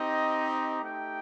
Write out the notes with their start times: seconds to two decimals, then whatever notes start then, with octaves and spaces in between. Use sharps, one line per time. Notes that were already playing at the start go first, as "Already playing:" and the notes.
Already playing: C4 D#4 G4 D#5
0.83 A3 D#4 G4 G5